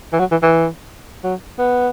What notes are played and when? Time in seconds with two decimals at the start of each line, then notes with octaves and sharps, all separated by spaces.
0.13 E3
0.19 F#3
0.31 E3
0.42 E3
1.24 F#3
1.58 B3